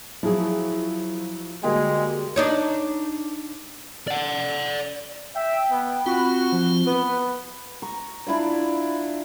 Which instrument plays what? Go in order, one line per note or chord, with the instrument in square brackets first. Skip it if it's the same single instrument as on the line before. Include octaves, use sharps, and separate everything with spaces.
[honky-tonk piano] F3 F#3 [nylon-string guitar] E4 G#4
[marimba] D3 F#4 [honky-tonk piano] G3 A#3 G4 [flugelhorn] G#3
[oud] D4 D#4 C#5
[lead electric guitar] D5 F#5
[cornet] E5 [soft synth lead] G5
[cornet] B3
[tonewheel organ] C4 F4 [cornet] F#4 [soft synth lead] B5
[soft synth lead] F3
[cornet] B3 [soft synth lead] B4
[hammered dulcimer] A#5 C#6
D4 E4 F4 D5